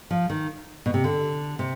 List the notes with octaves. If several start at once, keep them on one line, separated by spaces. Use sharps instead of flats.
F3
D#3
B2
C3
D3
C3